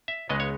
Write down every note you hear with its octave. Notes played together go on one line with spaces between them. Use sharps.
E5
C#2 C#3 G#3 B3 D#5
C#5